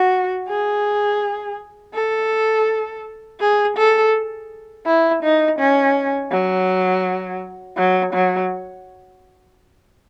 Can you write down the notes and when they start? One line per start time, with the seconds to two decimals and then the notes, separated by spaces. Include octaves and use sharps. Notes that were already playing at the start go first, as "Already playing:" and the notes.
Already playing: F#4
0.49 G#4
1.94 A4
3.40 G#4
3.77 A4
4.86 E4
5.23 D#4
5.59 C#4
6.31 F#3
7.77 F#3
8.13 F#3